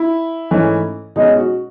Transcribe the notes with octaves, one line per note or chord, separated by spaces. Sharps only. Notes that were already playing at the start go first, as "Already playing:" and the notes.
Already playing: E4
G#2 E3 A3 C#4
B2 G#3 C#4 D#4
F#4